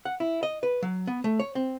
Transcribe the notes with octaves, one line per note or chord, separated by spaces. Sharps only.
F#5
E4
D#5
B4
F#3
B3
A3
C#5
C4